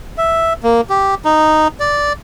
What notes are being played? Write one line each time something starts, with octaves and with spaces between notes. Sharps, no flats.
E5
A#3
G4
D#4
D5